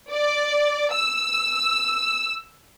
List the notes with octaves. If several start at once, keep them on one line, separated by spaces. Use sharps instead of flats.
D5
E6